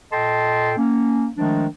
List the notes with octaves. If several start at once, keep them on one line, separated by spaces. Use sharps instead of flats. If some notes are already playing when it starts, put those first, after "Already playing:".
A#2 A4 D#5 G5 A5 C6
A#3 C#4
D#3 F3 G#3 A3 D4